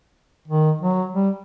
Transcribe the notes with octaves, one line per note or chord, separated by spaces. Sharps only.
D#3
F#3
G3